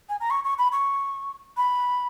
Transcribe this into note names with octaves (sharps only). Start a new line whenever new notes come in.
G#5
A#5
C#6
C#6
B5
C#6
B5